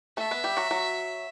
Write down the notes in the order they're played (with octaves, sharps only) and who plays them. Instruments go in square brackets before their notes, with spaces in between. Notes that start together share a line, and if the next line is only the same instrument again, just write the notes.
[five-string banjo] A3 A4 [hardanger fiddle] E5
[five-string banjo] B3 B4
G3 G4
F#3 F#4
F#3 F#4